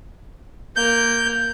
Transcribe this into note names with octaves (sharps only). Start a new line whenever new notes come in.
A#3 G6